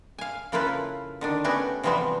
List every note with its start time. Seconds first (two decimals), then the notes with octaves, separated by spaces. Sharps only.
0.18 F5 G#5
0.52 C#3 A#3 E4 F4 A4 B4
1.21 D3 D#3 D4
1.44 A3 B3 C#4 F#4 G4
1.83 C3 E3 F3 G3 B3 C4